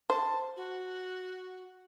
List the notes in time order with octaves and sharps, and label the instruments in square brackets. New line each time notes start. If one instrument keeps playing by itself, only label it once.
[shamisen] C5 [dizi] A5
[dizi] F#4